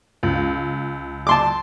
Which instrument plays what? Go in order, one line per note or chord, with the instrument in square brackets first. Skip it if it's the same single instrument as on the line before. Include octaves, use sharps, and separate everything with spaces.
[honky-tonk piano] C#2
[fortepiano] A5 C6 D6